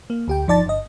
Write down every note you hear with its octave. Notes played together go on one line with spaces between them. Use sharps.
A#3
D2 G4 G5
G1 F3 D#4 D5 A5 A6
G1 D#5